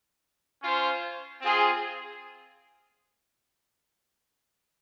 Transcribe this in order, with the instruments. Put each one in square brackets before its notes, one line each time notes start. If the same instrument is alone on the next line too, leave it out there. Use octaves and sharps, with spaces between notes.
[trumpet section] C#4 F4 C5
C4 F4 G#4